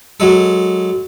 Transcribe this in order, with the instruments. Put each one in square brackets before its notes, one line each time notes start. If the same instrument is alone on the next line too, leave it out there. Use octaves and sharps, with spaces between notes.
[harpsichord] F#3 G#3 A4